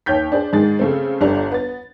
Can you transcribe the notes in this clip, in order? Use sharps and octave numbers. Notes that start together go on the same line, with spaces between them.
D#2 C#5 G5 G6 B6
D4 G#4 C5 D5
G#2 D#3 G#3 G#4 A6
C#3 A3 C4
G1 D3 D4 G4 F7
B3 A6